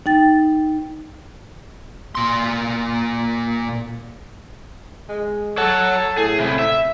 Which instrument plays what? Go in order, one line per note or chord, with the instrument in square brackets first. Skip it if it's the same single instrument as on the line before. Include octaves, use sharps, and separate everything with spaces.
[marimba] D#4 G5 A6
[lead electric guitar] A#2 C6
[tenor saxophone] G#3
[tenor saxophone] A4 [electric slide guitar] C#5 F#5
[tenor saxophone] A2 [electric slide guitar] G#4
[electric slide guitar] C3 E4
E5